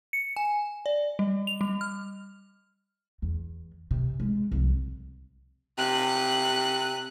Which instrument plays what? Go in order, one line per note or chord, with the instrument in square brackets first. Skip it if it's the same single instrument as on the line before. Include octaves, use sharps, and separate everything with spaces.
[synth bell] C#7
G#5
D5
G3
F7
G3
F6
[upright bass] E2
C3
G#3
C2 F3
[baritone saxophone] C3 [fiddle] F#6